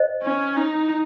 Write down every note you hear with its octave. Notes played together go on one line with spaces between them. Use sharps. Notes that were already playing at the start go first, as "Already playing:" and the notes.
Already playing: C5 D#5
C#4
D#4